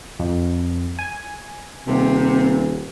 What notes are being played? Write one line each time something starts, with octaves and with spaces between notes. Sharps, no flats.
F2
G#5
D#1 C3